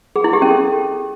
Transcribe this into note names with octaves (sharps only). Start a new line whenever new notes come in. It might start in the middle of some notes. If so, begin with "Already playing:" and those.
G#4
E4
G4
C#4
A4